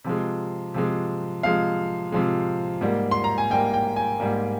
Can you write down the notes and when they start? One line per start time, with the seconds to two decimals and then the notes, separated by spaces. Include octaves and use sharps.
0.04 C3 F3 G#3
0.74 C3 F3 G#3
1.43 C3 F3 G#3 F5
2.12 C3 F3 G#3
2.81 G#2 G3 A#3
3.11 C6
3.24 A#5
3.38 G#5
3.50 G#2 G3 A#3 G5
3.74 G5
3.96 G#5
4.20 G#2 G3 A#3